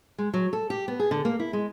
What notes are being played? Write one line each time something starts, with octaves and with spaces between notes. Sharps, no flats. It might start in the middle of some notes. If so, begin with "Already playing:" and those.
G#3
F#3
A4
G4
B3
G#4
D3
A#3
E4
G#3